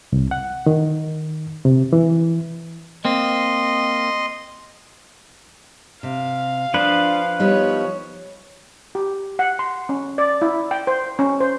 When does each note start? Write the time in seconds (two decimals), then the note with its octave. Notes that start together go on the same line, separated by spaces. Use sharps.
0.12 C2
0.31 F#5
0.66 D#3
1.65 C3
1.93 E3
3.05 A#3 C4 D#5 C6
6.03 C3 F5
6.74 F3 D4 B4
7.39 G3 B3 D#4 C#5
8.95 G4
9.39 F#5
9.59 C6
9.89 C#4
10.18 D5
10.42 E4
10.71 G5
10.87 C5
11.19 C#4
11.40 C5